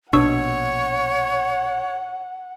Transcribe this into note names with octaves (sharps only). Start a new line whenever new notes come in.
A#1 B2 D4 C#5 F#5 C#6 E6